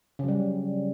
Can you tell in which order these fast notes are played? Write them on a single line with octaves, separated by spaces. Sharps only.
C#3 F#3 G3